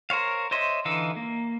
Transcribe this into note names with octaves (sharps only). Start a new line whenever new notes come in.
A#4 C5 C#5 F5
C5 C#5 D#5 E5 C6
D3 E3 D#4 F5 E6
A#3